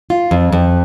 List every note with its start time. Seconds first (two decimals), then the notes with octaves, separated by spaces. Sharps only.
0.10 F4
0.31 F2
0.52 F2